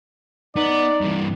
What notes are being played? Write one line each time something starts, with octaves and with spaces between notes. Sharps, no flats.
B3 D#4 D5
G2 E3